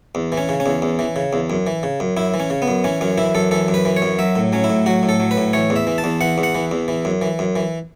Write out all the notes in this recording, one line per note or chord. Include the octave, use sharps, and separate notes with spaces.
E2
E3
C#4
C#3
C#4
E2
E2
E3
C#3
E2
F#2
E3
C#3
F#2
F#2 E4
E3
C#4
C#3
B3
F#2
E3 C#4
F#2 C#4
E3 E4
F#2 A4
E3 A4
F#2
B4
E3
C#5
F#2
F#3 E5
A2
F#3 C#4
E4
A2
F#3 F#4
A2
A4
F#3
B4
A2
E3 C#5
E2
E5
E3
A5
E2
E3 F#5
E2
F#5
E3
E2
E3
F#2
E3
F#2
E3